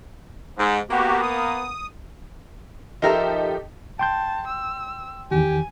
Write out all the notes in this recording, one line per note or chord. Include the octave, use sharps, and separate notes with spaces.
G#2
A#3 B3 F#4 G4
D#6
F3 D#4 G4 A4 A#4 E5
G5 A5 C6 G6
E6
E2 D#3 G4 G#5